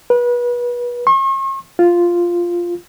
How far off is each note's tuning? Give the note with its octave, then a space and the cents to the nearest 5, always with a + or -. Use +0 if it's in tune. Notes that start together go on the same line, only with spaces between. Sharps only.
B4 -30
C#6 -45
F4 -5